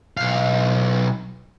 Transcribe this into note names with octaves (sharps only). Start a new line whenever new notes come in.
B1 F5